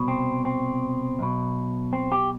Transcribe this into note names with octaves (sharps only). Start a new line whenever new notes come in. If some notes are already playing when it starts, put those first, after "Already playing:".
Already playing: C2 B2
C4
C4
B1 B2
C4
G4